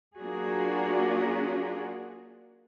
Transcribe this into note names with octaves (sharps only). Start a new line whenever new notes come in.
F#3 A#3 D4 F4 F#4 G#4